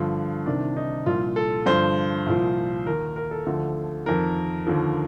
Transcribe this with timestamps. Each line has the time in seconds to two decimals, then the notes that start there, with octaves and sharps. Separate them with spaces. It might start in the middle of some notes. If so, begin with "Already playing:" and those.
Already playing: G2 D3 F3
0.46 C2 C3 D#3 D4
0.77 D#4
1.06 C2 A#2 F3 F4
1.36 A4
1.66 G2 D3 F3 C5
2.26 C2 A#2 F3
2.86 D#2 D#3 A#4
3.16 A#4
3.31 A4
3.46 D2 D3 F3
4.06 F2 D#3 A#4
4.67 D#2 D3 F3